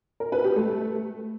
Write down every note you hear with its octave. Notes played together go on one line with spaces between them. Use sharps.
A#4
B4
G4
A3